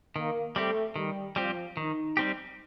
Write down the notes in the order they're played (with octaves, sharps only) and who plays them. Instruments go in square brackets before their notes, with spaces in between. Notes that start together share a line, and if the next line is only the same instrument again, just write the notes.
[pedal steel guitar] D#3 [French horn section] A#3
[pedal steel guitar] G3 C4 G4 [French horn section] A3
[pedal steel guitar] D#3 [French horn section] G3
[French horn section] F3 [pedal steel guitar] G3 C4 G4
[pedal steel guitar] D#3 [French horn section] D#4
[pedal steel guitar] G3 C4 G4